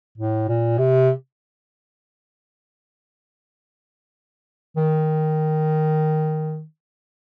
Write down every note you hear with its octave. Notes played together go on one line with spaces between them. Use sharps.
A2
A#2
C3
D#3